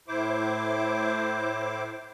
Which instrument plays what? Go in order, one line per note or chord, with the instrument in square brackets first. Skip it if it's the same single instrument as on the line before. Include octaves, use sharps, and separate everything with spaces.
[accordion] A2 E4 C5 D6